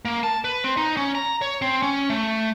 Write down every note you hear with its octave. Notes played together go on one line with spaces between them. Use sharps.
A#3
A5
B4
C4
D#4
C#4
A#5
C#5
C4
C#4
A3